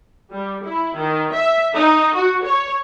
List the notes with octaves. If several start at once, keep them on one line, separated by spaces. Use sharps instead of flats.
G3
E4
D#3
E5
D#4
F#4
C#5